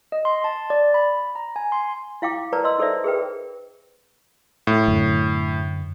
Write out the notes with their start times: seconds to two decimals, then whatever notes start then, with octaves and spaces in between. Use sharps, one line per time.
0.12 D#5
0.25 C6
0.44 A5
0.70 D5
0.94 B5
1.35 A#5
1.56 G#5
1.72 C6
2.22 E4 F5 G5 D6
2.52 A#4 B4 D5 A5 A#5
2.64 D#5 C6 E6
2.79 D#4 A4 C5 D5 E5
3.04 G#4 A#4 B4 G5
4.67 A2
4.88 F#2 D3